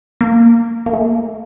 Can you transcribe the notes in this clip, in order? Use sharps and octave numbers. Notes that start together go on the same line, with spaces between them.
A#3
A#3
A3